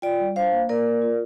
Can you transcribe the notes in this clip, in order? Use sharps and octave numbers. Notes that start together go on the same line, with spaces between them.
F4 D5 G5
G3
D4 C5 F5
A#3
A#3 A#4 D5
A#3
F4